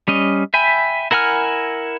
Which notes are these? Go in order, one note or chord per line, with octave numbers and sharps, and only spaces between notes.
G3 C#4 D#5
E5 G5 G#5 B5
E4 A#4 F#5 G#5 F6